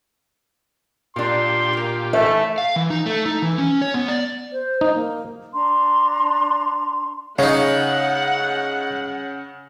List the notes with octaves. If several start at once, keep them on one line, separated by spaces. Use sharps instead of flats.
A#2 D4 F4 G4 A#4 C6
A#3 A#4
E3 A3 D#4 E5 A5
F5
E3
D#4
A3
D#4
E3
C#4
C#5
B3
D5
C5
D#4 C5
A#3
D4 A#5 C6
C#3 C#4 D#4 C#5 F5 F#5